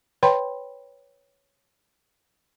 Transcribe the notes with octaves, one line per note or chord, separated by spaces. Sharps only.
B4 C#5 G5 B5 C6